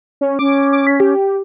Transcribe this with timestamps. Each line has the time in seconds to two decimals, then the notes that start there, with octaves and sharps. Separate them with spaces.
0.21 C#4
0.39 C#4 D6
0.73 D6
0.87 B6
1.00 G4